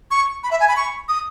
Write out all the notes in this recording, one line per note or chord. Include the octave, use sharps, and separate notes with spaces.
C#6
B5
E5
G#5
B5
C#6
D#6